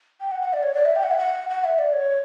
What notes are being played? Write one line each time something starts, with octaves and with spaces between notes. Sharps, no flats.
G5
F#5
F#5
D5
C#5
D5
E5
G5
F#5
E5
F#5
F#5
E5
D5
C#5